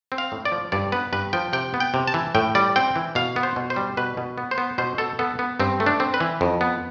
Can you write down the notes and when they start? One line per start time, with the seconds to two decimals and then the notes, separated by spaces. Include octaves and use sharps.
0.12 C4
0.18 F5
0.32 A2
0.45 D5
0.52 F3
0.72 G2 D5
0.92 B3 B4
1.13 G2 B4
1.33 F3 G5
1.53 C3 G5
1.74 B3
1.80 G5
1.94 C3
2.08 A5
2.14 E3
2.35 A2 G5
2.55 G3 D5
2.76 C4 G5
2.96 E3
3.15 B2 F5
3.36 B3
3.43 C5
3.56 B2
3.70 C5
3.76 G3
3.97 B2 B4
4.17 B2
4.38 B3
4.51 C5
4.58 B3
4.78 B2 C5
4.98 B2 A4
5.19 B3 A4
5.39 B3
5.60 G2 C4
5.80 A3
5.86 D4
6.00 C4
6.14 B4
6.20 E3
6.41 F2
6.61 B3